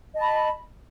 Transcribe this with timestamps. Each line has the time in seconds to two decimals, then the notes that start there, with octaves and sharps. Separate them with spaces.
0.14 D#5
0.17 A5
0.21 B5